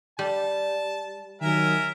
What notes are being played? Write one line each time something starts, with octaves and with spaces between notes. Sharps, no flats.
G3 A5
D#3 F#3 A#4 E5 G#5